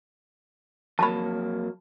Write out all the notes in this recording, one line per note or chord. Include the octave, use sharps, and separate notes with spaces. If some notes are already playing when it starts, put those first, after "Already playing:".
F2 F#3 A#3 A5 B5